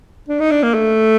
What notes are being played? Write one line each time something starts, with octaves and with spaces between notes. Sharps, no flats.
D4
D#4
D4
A#3
A3